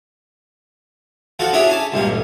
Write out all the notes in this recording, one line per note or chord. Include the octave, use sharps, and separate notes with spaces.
F3 F4 F#4 A4
C#4 D4 E4 G#4 C#5
G#5 A5
C#2 G2 A#2 C#4
A1